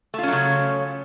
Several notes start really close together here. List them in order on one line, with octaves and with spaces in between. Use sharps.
A3 F4 C#4 F#3 C#3